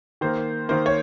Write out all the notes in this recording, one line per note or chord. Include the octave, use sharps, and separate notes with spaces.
D#3 A#3 C5
D#3 A#3 C5
C#5